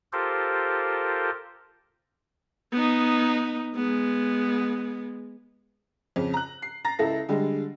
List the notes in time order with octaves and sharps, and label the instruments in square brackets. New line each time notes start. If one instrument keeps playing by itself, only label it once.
[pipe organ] F4 G4 A4 A#4 C5
[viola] B3 D#4
G#3 B3
[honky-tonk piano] F2 C#3
A#5 F#6
C7
A#5 A6 A#6
C#2 E4 A4 A#6
D3 G3 G#3